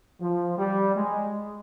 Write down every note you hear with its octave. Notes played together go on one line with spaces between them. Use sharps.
F3
G3
G#3